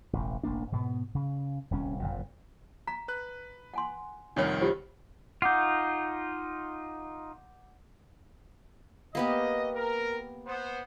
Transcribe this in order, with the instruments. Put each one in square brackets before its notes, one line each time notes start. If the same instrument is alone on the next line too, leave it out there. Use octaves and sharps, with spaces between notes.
[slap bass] E1 A1
E1 A1 A#3 D4
G#2 B2 B3
C#3
D#1 C2 C#4
F#1 F2 A#2
[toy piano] A#5 [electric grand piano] B6
[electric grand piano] B4 F#6
[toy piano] F#5 G#5 C6
[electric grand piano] C2 F2 D#3 [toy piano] D4 C#5 F#5
[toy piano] F4 G4 C5
[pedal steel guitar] D#4 F4 [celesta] F#5 D6 G6
[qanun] A#3 B3 G4 [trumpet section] D#5
[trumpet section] A#4
B3 C5